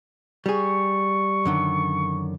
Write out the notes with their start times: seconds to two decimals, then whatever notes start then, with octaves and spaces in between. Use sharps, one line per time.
0.46 G3 G#4 C#6
1.45 F#2 D3 D#3